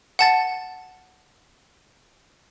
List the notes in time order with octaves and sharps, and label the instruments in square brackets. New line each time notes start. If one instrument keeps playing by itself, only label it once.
[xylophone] F#5 A5 A6